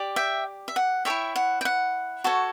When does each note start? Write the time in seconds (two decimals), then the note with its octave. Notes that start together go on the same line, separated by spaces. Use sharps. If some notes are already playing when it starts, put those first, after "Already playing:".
Already playing: G4 D5
0.16 E5 G5
0.68 E5
0.76 F#5
1.05 A4 C#5 E5 G5
1.10 E4
1.36 F#5
1.61 G5
1.65 F#5
2.24 F#4 A4 C#5